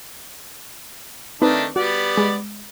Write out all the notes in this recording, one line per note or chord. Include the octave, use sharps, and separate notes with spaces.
D#3 A3 C4 D4 D#4 B4
G3 B3 F#4 D5
G#3